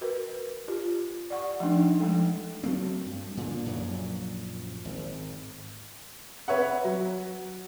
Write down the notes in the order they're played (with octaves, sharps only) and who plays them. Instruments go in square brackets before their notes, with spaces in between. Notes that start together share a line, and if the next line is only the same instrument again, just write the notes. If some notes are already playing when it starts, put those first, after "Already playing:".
[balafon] F#4 A#4 B4
F4 G4
D5 F#5 C#6
F3 A3 D4 D#4
F3 G#3 A3 A4
[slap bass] F#3 A3 A#3 C4
G2
A#2 D3
A#1 F#2 A#2 F#3
G#1
[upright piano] B4 C#5 E5 F#5
F#3